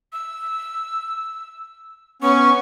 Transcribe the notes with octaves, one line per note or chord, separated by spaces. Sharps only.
E6
B3 C#4 C#6